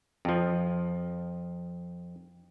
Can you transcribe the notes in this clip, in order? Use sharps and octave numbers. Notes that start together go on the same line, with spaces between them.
F2 F3